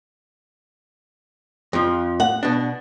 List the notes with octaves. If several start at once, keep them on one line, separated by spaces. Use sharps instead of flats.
F2 F3
F#5
B2 D4